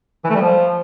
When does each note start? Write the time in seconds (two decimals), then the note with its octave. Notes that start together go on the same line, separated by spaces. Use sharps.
0.25 E3
0.30 A3
0.35 G3
0.40 F3